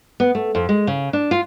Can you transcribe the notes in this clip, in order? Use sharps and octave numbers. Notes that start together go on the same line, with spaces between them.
B3
A3
F2
G#3
C#3
D4
F4